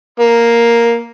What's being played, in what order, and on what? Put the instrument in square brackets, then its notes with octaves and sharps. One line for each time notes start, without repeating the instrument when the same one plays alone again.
[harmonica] A#3